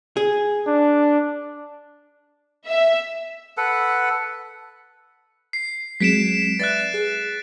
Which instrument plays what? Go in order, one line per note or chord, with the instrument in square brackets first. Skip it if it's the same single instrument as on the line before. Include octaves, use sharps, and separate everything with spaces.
[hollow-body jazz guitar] G#4
[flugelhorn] D4
[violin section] E5
[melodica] A4 B4 F#5
[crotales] C7
[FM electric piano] F#3 G#3 C4 [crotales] B6 D7 E7
[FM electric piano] B4 D5 E5 [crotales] F#6 A6
[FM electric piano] G#4